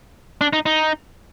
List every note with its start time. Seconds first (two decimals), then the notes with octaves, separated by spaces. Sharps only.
0.41 D4
0.53 D#4
0.66 D#4